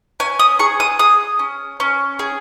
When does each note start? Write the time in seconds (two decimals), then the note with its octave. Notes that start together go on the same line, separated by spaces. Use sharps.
0.20 C#4 G#5
0.39 D#6
0.59 G#4 C#6
0.80 D#6
0.99 G#4 D#6
1.39 C#4
1.80 C#4
2.19 G#4